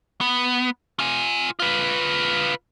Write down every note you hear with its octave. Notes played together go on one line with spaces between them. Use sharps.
B3
F4 G#5
F4 B4